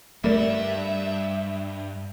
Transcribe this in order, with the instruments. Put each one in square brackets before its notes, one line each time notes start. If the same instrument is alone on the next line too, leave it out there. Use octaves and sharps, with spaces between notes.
[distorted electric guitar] G2 [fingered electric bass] G3 [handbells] A3 A#4 D5 [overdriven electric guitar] E5